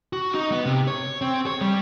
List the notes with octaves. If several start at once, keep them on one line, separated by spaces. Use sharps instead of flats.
F#4
D#4
B3
C3
C#5
C4
C#5
G3